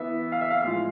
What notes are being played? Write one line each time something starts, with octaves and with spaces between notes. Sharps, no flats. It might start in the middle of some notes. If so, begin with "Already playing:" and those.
Already playing: E3 B3 E5
F5
E5
F5
A2 F3 G#3